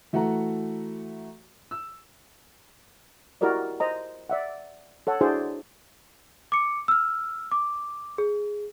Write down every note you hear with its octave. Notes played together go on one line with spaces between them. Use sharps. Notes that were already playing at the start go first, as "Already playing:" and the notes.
E3 A3 F#4 F#5 A#5
E6
E4 F#4 G4 A#4 D5 D#5
C5 D#5 A#5
D5 E5 F#5
A4 C#5 F#5
D4 E4 F#4 G#4 C5 D5
D6 C#7
E6 F6
D6
G#4